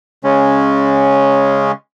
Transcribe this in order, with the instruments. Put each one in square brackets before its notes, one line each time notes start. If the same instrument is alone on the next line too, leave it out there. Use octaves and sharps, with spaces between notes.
[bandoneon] C#3 G#3 C#4